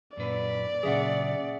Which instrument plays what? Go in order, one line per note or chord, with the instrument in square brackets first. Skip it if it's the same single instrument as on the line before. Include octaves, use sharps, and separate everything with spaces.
[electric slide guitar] F#2 A#2 B4 [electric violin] D5
[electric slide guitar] A#2 C#3 F#3 [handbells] G#4 E5 F#5